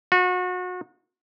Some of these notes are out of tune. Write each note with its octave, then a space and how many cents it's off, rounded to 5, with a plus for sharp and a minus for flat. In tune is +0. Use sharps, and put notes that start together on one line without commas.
F#4 -30